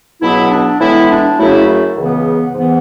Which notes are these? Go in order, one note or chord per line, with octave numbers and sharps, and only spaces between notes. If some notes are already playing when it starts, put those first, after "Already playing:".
C#2 B2 F#3 B3 E4
D4
A2 E3 G#3 B3 E4
D4
F#2 C#3 F#3 A3 E4
C#2 C#3 E3 B3
G#2 E3 B3